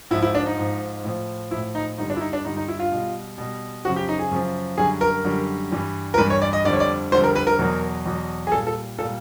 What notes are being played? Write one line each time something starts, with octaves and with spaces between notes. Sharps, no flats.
G#2 F3 E4
E4
D4
D#4
G#2 F3
A2 F3
A2 F3 E4
D#4
G2 D3 G3 D#4
D4
E4
D#4
D4
G2 D3 G3 D#4
D#4
E4
F4
B2 G3
B2 G3
F#2 C#3 F3 F#4
G4
D#4
G#4
F#2 C#3 F3
F#2 D3 G3 G#4
A#4
F#2 D3 G3
G2 E3 G3
A#4
G2 E3 G3 B4
C#5
D5
D#5
F2 D3 G3 D5
C#5
D5
F2 D3 G3 C5
A#4
B4
A#4
E2 B2 F#3
E2 B2 F#3
G#4
A#2 G3 A4
A4
A#2 G3 A4